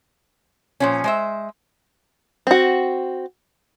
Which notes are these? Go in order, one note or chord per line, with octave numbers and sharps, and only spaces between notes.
A#2 F3 C#4
G#3 C5 E5
C4 F#4